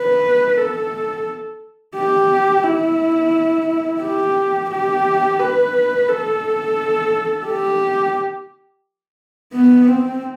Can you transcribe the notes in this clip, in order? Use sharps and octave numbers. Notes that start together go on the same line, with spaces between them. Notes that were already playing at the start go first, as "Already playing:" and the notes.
Already playing: B4
A4
G4
E4
G4
G4
B4
A4
G4
B3
C4